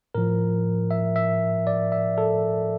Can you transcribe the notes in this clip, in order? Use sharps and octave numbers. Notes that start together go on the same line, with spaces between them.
A2 F3 A#4
E5
E5
D5
E5
A4